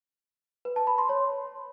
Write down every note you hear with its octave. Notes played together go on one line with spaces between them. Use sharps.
B4
A5
B5
C6
C#5